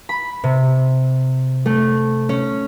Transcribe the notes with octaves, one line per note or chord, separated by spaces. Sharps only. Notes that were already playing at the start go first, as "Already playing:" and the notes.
B5
C3
A3
C#4